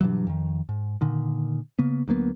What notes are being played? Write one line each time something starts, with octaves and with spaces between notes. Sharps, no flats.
G2 B2 E3 F#3
F2 D#3
G#2
A#2 D3 D#3
C#3 A#3 B3
D2 F#3 A#3 B3